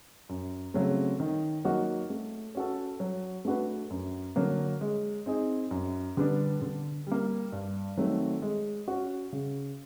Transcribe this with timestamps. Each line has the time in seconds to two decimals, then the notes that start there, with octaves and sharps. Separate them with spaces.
0.29 F#2
0.74 C#3 F#3 A3 C4
1.20 D#3
1.64 F#3 A#3 D#4 F#4
2.10 A3
2.55 C#4 F#4 A4
3.00 F#3
3.45 A3 D4 F#4 B4
3.90 F#2
4.36 D3 F#3 A#3
4.81 G#3
5.26 C4 D#4 G#4
5.71 F#2
6.17 D3 G3 B3 D4
6.62 D3
7.07 G3 A#3
7.52 G2
7.97 D#3 F#3 A3 C4
8.42 G#3
8.88 C#4 F#4
9.33 C#3